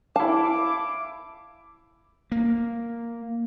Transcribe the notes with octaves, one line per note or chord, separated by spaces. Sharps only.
E4 F5 A5 D6
A#3